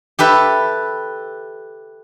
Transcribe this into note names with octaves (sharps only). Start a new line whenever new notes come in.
G4 A4 B4 E5